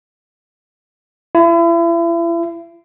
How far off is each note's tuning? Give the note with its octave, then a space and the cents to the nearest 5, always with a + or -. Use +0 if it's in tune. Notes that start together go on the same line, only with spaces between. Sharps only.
E4 +40